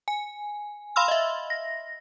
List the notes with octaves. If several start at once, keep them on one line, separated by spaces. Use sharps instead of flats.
G#5
F5 B5 C6 E6 F6
D#5 E5
A#6